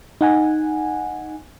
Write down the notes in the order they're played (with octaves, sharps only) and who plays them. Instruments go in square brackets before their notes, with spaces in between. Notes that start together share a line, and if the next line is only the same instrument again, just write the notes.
[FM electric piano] D#4 F#5 G#5